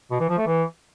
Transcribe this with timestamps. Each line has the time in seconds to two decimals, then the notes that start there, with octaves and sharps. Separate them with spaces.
0.11 B2
0.20 E3
0.29 F3
0.38 A3
0.47 E3